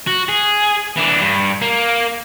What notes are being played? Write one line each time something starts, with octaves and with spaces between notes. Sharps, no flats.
F#4
G#4
E3 D4
G2
A#3